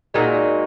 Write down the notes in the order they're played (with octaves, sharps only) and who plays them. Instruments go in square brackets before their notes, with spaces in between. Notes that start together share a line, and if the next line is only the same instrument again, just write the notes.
[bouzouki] A#2 G#3 D#4 F#4